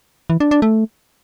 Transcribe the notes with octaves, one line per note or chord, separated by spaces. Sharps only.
E3
D4
D4
A3